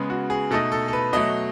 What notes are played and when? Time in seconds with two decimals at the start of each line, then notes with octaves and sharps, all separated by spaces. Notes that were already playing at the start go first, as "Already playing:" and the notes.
Already playing: C#3 G#3 B3
0.10 F#4
0.30 G#4
0.51 B2 A3 D#4 A4
0.72 A4
0.88 A4
0.93 B4
1.13 B2 F#3 A3 D#5